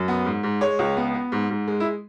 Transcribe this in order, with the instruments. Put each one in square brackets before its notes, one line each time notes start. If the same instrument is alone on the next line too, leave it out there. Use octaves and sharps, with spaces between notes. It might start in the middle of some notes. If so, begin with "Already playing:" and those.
Already playing: [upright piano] F#2
B3
G#2
G#2
G#3 C#5
C#2
B3
B3
G#2
G#2
G#3
E4